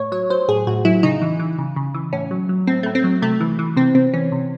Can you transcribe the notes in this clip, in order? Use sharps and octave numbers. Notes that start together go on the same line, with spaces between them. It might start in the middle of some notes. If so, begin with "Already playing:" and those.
Already playing: A2 C#5
F#3 C#5
F#3 C5
A2 G#4
A2 F#4
F#3 E4
C#3 D#4
E3
E3
C#3
C#3
E3
A2 C#4
F#3
F#3
A2 C4
A2 A3
C4
F#3
C3 A3
E3
E3
C3 C4
C3 C4
E3 C#4
C3